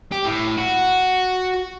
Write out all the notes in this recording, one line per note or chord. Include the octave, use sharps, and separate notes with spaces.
G4
A2
F#4